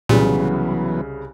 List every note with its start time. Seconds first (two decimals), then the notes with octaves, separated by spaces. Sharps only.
0.09 C2 A#2 C#3 E3 F#3 B3